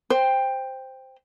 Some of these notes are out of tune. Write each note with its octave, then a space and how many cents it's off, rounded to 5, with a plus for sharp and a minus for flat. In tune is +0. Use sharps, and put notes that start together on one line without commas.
C5 +0 G5 +10